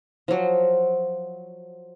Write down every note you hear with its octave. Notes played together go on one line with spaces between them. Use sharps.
F3 F#3